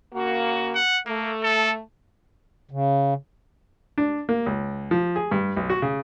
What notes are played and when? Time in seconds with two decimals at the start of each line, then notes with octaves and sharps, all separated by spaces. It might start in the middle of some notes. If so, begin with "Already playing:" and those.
0.14 C#3 A#3 F#4
0.75 F#5
1.06 A3 A#3
1.43 A4
2.71 C#3
3.98 D4
4.29 A#3
4.46 C#2
4.91 F3
5.16 G#4
5.31 G2
5.56 B1
5.70 F#4
5.82 C#3